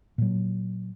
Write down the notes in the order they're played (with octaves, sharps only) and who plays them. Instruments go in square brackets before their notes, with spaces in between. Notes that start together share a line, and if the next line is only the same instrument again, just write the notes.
[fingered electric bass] A#2 F#3